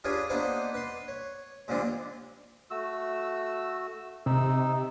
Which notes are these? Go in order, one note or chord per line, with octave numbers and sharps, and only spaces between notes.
G3 D4 F4 G#4 B4 C#5
A#3 B3 D4 D#4 B4 C5
B4 C6
C#5
D#2 A#2 D3 F3 C4 D4
A3 F#4 E6
C3 D#4 E6